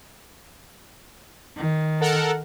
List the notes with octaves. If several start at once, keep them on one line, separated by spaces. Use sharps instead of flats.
D#3
A4 A#4 F#5